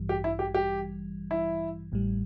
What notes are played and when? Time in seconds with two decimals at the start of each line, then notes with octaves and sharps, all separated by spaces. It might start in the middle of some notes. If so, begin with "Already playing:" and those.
Already playing: A1 G2 E3 G3
0.09 G4
0.24 E4
0.39 G4
0.54 G4
1.31 E4
1.92 A1 A2 G3